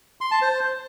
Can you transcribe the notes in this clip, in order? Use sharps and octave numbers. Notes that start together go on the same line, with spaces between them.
C6
A5
C5